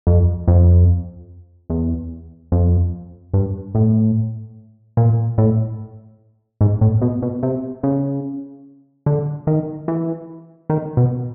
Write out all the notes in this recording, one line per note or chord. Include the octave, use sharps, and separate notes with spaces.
F2
F2
E2
F2
G2
A2
A#2
A2
G#2
A2
B2
B2
C3
C#3
D3
D#3
E3
D#3
B2